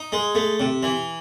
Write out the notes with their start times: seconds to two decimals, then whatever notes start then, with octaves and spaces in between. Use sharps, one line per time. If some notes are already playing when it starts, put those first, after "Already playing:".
Already playing: D#4
0.12 G#3
0.35 A3
0.60 C3
0.83 E3